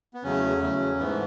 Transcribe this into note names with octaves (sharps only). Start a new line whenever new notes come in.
B3
E2 C#3 F#3 A3 C#4
E2 C#3 F#3 A3
G#2 E3 A3 B3